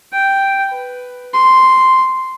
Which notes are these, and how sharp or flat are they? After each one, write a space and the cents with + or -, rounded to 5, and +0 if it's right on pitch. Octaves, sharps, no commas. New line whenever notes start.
G5 +0
B4 +5
C6 -5